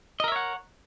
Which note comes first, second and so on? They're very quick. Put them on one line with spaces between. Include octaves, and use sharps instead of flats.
D#5 A#4 E5 C#5 F#5